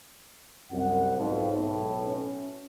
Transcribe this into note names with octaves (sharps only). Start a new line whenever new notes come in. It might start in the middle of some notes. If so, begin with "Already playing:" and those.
C2 F#2 F#5
B1 F2 G#2
B1 A2
C#4